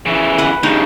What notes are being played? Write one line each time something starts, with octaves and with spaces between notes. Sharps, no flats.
C#3 E3
B4 F#5
G2 C#3 D#4